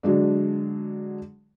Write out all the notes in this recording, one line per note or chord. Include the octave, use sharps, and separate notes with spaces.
D3 F#3 G#3 D4